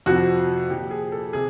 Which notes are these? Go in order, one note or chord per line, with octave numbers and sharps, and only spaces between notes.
F2 C3 F3 F#4
A#2 F3 G4
G#4
A4
C3 G#4